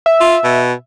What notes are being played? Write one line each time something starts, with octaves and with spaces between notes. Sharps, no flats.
E5
F4
B2